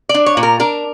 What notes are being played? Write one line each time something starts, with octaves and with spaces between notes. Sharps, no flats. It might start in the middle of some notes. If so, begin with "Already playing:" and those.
D5
D4
C#5
A#2
A#4
D4 A#4